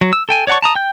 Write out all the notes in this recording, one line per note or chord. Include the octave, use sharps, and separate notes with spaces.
F#3
E6
A4 G5 G#5
C#5 D5 F#5 A5 C#6
A5 A#5 D#6
G5 G6